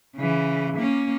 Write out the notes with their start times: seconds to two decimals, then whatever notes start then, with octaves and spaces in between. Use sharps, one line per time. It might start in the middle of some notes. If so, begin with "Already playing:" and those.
0.16 C#3 E3
0.77 A#3 C#4